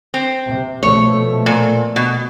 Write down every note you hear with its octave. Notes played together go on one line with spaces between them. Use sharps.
C4
C3
B2 F3 A3 C#5
A#2
B2